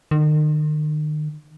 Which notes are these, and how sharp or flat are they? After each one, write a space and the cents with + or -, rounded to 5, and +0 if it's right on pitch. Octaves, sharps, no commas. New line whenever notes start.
D#3 -40